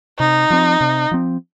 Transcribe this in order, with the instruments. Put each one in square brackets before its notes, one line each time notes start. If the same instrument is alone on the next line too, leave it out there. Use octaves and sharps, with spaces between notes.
[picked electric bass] C3 [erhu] D#4
[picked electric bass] F3 C4
C3
F3 C4